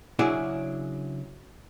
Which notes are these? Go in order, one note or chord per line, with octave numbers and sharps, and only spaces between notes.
C#3 F#3 D4 E4 G#4 E5